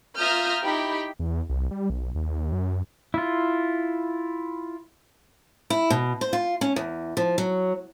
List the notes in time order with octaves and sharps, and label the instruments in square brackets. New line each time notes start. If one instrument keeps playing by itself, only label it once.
[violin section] F4 E5 A#5 D#6 F6 G6
D#4 E4 G4 G5 B5
[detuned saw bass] E2
C2
G3
B1
D#2
F#2
[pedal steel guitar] E4 F4
[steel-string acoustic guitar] E4
B2
C5
F4
C#4
E2
F3
F#3